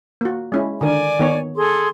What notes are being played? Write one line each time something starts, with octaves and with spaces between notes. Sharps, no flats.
A#3 F#4
G#3 C#4 E4
D3 D#3 A#4 D5 G#5
D#3 B3 C#5
G#4 A4 C6